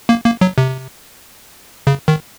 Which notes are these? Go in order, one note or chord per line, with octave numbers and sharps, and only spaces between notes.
A#3
A#3
F#3
C3
C#3
D#3